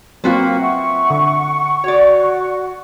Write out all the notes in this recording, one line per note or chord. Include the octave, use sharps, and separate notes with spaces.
F#3 A#3 C4 F4 F#4 B4 C5
E5 F#5 C#6
D3
F#4 C#5 D5